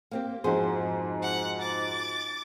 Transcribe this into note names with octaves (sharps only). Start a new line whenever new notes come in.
A#3 C4 G4
F2 G#2 F#4 G#4 C5
F#5
D6 A6